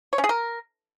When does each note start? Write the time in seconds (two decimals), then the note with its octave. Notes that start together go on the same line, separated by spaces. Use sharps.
0.13 C#5
0.18 C#4
0.24 G#4
0.29 A#4